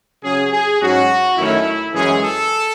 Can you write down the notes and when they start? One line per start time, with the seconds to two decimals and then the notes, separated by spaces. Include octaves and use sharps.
0.22 C#3 F#3 C#4 G#4
0.51 G#4
0.80 G#2 F#3 C#4 F#4
1.37 F#2 D#3 A3 C#4 E4
1.93 F#2 E3 G#3 C#4 G#4
2.22 A4